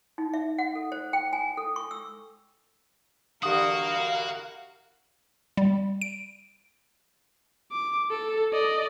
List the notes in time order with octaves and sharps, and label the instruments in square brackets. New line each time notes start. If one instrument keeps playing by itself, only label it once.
[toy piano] D#4
E5
F#5
A4
C5
G5
G#5
A4
C#6
E6
[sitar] B2 D3 E3 [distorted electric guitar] F#4 [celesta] G4 D#6 [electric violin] A#4 F5
[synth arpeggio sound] G3
D7
[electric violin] D6
A4
D5 D#5